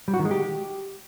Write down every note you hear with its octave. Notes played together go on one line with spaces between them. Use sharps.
G3
F#4
D#3
G#3
G4